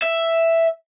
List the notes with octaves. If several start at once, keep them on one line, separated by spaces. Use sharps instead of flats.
E5